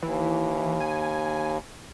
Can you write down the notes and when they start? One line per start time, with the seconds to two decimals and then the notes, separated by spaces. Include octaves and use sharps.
0.03 D#2 E3
0.80 G#5